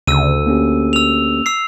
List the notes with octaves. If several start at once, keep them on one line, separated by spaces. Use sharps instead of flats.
D2 C#3 E6 D#7
A#3 C#4 G4
E6 F7
E6 C7